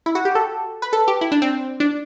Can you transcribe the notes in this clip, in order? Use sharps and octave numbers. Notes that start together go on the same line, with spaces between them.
E4
F#4
G4
A4
B4
A4
G4
E4
D4
C4
D4